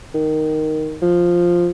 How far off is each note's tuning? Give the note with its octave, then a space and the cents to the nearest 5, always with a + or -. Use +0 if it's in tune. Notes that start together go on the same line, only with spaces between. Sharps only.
D#3 +0
F3 +0